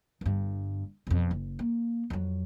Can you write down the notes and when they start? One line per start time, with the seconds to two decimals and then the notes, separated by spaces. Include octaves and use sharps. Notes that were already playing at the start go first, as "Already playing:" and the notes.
0.21 G1 G2
1.07 F2 B2
1.31 F#1
1.59 A#3
2.10 F2 F#3